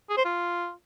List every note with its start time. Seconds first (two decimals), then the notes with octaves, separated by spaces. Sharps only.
0.10 G#4
0.17 C5
0.25 F4